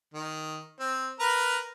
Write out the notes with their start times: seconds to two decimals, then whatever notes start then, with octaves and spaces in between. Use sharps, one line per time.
0.14 D#3
0.80 C4
1.20 A#4 B4 A#5